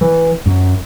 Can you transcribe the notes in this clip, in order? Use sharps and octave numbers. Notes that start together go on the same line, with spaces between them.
E3
F#2